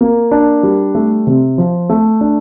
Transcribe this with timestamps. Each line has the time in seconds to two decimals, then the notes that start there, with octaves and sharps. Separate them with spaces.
0.01 A#3
0.31 D4
0.63 G3
0.95 A3
1.27 C3
1.58 F3
1.89 A3
2.21 D4